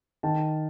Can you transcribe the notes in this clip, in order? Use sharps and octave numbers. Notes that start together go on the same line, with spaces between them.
D#3 A5